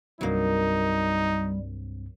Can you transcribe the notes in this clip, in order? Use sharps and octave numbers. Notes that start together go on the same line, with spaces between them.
C2 G2 F#3 G3 A#3 C4 D#4